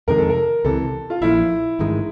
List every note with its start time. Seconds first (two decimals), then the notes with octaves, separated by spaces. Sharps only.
0.08 F2 C3 D#3 G#3 A#4
0.18 A4
0.29 A#4
0.65 C#2 C3 E3 A4
1.10 F4
1.21 A#1 A#2 F3 E4
1.79 A1 G#2 D#3 G#3